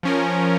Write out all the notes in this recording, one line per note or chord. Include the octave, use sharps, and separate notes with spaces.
F3 C#4 A#4